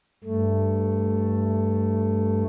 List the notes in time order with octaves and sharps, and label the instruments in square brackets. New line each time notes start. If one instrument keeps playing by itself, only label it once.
[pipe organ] G2 A3